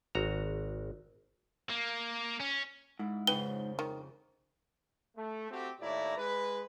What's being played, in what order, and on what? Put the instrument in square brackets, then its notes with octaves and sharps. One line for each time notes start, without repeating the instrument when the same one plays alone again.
[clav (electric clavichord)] G#1 F#4 A#5
[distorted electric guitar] A#3
C#4
[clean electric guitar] G#2 [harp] E4
[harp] F2 C#3 C5 [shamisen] D#4 B4 G5 [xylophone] G7
[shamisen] D#3
[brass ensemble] A3
A3 C4 F#4 G4
D#2 A2 E4 D5 A#5
G#3 B4